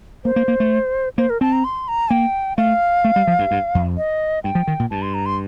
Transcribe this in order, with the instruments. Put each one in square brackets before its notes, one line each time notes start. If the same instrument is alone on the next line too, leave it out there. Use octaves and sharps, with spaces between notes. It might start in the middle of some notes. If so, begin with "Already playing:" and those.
[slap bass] A#3 [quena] C5
[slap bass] A#3
A#3
A3
[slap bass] A#3 [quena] C5
[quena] A#4
[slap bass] C4 [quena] A5
[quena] A#5
C6
A#5
[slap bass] A#3 [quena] G5
[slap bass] A3 [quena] F5
[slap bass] A3
G3
F3
G2
G2
F2
[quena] D#5
[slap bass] G2 [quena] G5
[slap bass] F3
D#3
A#2
[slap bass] G2 [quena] A5
[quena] C6
A#5
C6